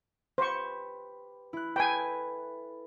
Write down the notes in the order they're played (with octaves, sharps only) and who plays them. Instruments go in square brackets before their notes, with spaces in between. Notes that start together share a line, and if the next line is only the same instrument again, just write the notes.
[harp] G4 B4 [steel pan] C5 C#6
[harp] E4 F#6
[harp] A4 B4 [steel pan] G5 G#5